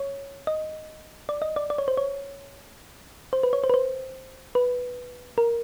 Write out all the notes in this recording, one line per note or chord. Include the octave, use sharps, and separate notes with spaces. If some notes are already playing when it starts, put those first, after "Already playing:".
Already playing: C#5
D#5
D5
D#5
D5
D5
C#5
C5
C#5
C5
B4
C#5
C5
B4
C5
B4
A#4